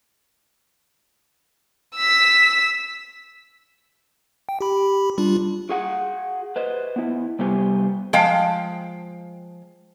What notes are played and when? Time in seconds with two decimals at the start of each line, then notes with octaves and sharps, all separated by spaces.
1.96 E6 B6
4.49 G5
4.61 G4 B5
5.18 G3 D4 F4
5.69 F#4 G#4 F#5
6.56 B4 C5 D#5
6.96 B3 E4
7.39 C3 G3 B3 G4 C5 G#5
8.13 F3 G#3 F5 G5